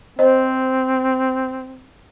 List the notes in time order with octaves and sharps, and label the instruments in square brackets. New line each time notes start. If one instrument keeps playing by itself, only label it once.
[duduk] C4 [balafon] C5 D#5